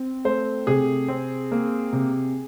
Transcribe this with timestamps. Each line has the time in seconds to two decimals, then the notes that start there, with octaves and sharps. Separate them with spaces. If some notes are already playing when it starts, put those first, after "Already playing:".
Already playing: C4
0.25 A3 C5
0.67 C3 G#4
1.08 C4
1.52 A#3
1.93 C3